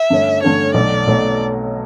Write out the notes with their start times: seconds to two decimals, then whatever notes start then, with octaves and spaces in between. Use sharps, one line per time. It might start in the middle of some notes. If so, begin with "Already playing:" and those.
Already playing: E5
0.10 G2 D3 A3 C#4
0.42 G2 D3 A3 C#4 C#5
0.74 B1 B2 F#3 A3 D5
1.07 B1 B2 F#3 A3